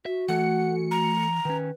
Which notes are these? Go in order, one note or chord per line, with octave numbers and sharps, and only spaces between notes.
F#4 E5
E3 A3 F#5 C#7
A#5
D#3 C#4 B4